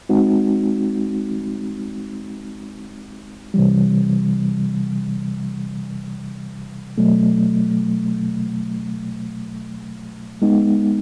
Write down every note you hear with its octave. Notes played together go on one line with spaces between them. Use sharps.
G#3 C4 D#4 F#4
C3 E3 G3
B2 F#3 A3
G#3 B3 D#4